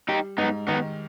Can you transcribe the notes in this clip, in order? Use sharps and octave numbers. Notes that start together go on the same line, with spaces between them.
G3 D#4 G4
G#2 B3 D#4
D#3 B3 D#4